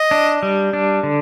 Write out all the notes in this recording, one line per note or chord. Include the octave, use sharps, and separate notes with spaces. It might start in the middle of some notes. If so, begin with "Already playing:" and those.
Already playing: D#5
D4
G3
D4
D3